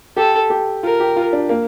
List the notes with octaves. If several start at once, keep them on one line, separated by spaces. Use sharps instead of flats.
G4 A4
G4
F4 A#4
G4
F4
D4
A#3